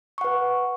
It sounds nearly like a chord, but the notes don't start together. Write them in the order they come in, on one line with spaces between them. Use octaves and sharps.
C#6 F#5 B4